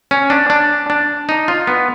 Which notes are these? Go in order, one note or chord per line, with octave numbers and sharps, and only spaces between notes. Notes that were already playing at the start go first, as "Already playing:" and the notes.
C#4
D4
D4
D4
D#4
F4
B3